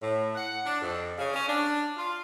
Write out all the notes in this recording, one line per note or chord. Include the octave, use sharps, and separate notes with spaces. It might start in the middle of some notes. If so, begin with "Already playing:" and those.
A2
F#5
D4
F2
C#3
C#4
D4
F4